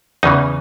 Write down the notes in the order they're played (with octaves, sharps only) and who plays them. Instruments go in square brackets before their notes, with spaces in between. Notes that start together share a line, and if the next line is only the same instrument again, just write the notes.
[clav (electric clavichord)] E2 C#3 E3 D#4